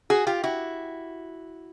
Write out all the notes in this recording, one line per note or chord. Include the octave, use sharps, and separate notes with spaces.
F#4 G#4
F4 G4
E4 F#4